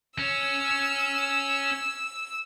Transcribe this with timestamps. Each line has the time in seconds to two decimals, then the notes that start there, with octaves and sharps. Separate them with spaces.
0.19 C#4 C#5 E6